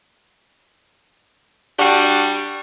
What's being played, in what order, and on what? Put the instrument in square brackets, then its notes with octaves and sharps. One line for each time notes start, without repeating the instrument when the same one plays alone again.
[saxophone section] G3 D4 F#4 G4